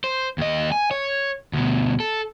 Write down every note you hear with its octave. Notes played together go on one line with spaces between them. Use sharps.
C5
D#2 D#5
G#5
C#5
D2 B2
A4